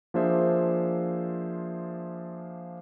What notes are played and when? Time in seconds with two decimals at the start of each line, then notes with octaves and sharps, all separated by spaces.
0.14 F3 A#3 D4 G#4 C5 E5